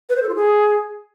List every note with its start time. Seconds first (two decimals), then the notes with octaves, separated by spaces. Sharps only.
0.09 B4
0.16 C5
0.22 A4
0.29 F4
0.35 G#4